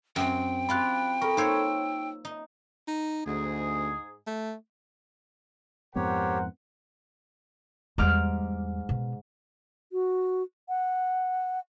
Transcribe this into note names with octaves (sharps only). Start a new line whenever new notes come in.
F#2 C4 G5
C4 F4 G4 B5 F#6
A4 A#4 B5 C#6
A#3 D#4 C5 C#5 E6
D#4
D#4
D2 G#2 G#4
A3
F2 G#2 B3 G4 A#4 C5 C#5 F#5
E2 G#2 G3 D6 F6
B2
F#4
F#5